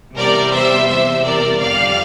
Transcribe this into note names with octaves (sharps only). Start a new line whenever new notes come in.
E2 C3 G3 A#4 D5
C5 E5
E2 C3 G3 C5 E5
A#4 D5
G1 F2 D3 G3 D5 F5